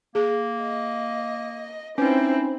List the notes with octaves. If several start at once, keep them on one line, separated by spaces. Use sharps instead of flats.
A#3 G#4
D#5
C4 C#4 D#4 E4 B4 C5